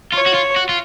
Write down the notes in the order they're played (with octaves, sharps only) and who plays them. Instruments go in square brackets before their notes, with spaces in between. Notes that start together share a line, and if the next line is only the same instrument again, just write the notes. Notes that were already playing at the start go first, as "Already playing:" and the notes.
[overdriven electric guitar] F4 [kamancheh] C#5
[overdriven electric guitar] F#4
F4
F#4
F4